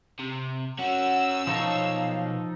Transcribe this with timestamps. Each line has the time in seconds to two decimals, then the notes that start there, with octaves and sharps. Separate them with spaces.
0.19 C3
0.79 C#4 F#4 F#5 E6
1.47 B1 F3 D#4 A4 C#5 F5